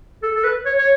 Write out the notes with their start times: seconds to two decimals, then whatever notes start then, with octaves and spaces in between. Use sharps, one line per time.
0.23 A4
0.36 A4
0.44 B4
0.66 C#5
0.78 C#5